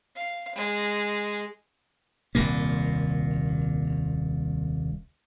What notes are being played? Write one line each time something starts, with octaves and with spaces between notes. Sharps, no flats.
F5
G#3
D#1 C2 A#2 A#3